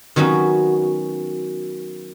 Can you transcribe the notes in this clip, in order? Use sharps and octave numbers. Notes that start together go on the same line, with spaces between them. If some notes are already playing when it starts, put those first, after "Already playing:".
D#3 F#3 B3 C#4 F#4